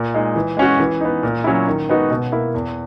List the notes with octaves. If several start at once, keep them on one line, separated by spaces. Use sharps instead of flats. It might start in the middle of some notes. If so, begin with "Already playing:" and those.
Already playing: A#2
G#3 D#4
E3
G#3 C#4 F#4
E3
B3 D#4
A#2
F#3 C#4 E4
D#3
G#3 B3 D#4 F#4
B2
A#3 E4
E2